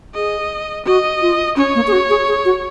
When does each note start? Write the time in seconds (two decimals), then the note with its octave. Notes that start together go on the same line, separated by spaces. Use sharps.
0.14 G#4 D#5
0.86 F#4 D#5
1.22 F4
1.56 C#4 C#5
1.75 A#3
1.87 G#4
1.92 F#4
2.10 G#4
2.28 G#4
2.45 F#4